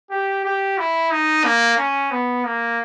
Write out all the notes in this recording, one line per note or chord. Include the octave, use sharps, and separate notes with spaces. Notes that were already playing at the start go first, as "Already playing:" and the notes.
G4
G4
E4
D#4
A#3
C#4
B3
A#3